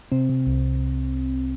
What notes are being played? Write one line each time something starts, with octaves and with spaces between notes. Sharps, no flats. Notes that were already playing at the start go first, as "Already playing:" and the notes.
C3 C4
C3
C2